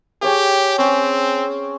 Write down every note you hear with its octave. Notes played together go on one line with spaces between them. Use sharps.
G4 G#4 C#5 G5
C4 C#4